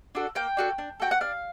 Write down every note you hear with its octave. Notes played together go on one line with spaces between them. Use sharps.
D4 F#4 A4
A#3 G5
D4 F#4 A4
D4
F#4 A4 G5
F#5
D4 F5